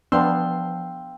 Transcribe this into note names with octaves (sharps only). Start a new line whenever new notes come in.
F3 B3 D4 F5 G5 C6 E6